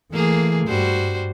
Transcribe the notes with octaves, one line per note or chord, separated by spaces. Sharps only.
E3 A3 A#3 G#4
G2 G3 F#4 C5